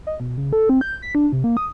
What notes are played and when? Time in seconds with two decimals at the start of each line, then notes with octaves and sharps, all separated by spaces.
0.07 D#5
0.20 B2
0.37 C#3
0.53 A4
0.69 C4
0.81 G6
1.02 B6
1.15 D4
1.32 C3
1.44 A#3
1.57 D#6